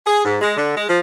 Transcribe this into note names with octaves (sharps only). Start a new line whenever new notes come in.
G#4
G#2
G#3
D3
G#3
F3